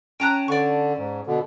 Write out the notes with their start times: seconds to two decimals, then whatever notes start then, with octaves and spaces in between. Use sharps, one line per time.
0.20 C#4 G5 A5 A#5 F#6
0.48 D3 D5 C#6
0.98 G#2
1.27 B2 D3